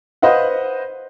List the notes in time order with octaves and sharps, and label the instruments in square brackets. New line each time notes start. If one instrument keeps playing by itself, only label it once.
[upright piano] B4 C5 D#5 F5 F#5